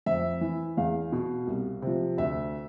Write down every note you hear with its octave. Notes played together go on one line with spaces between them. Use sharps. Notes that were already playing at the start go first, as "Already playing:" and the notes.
F2 E5
E3
E2 F5
B2
C2
C3 F3
D2 E5